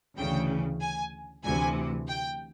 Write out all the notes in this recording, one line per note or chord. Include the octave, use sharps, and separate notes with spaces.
D2 C#3 E3 G5
G#5
D2 C3 E3 G#5
G5